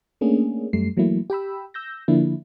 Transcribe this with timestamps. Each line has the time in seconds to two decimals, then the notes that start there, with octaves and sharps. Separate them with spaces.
0.21 A3 A#3 C#4 D4 G#4
0.73 F#2 G3 A3 C7
0.97 E3 F#3 A3 A#3 E4
1.30 G4 G5 B5 E6
1.74 E6 G6 A#6
2.08 D3 F3 A#3 D4 E4